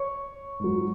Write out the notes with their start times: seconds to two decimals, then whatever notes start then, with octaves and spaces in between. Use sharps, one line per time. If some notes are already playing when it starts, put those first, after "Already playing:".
Already playing: C#5 C#6
0.60 G#2 F#3